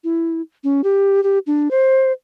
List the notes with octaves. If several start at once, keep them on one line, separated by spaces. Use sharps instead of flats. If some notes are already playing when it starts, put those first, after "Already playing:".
E4
C#4
G4
G4
D4
C5